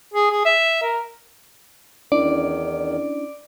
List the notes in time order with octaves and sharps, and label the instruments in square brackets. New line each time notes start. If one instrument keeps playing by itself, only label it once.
[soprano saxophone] G#4
G#4
E5
A#4
[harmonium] E2 D#3 [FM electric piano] C#4 D4 E4 [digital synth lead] D5